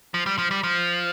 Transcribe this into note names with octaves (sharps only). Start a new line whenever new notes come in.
F3
G3
F3
G3
F3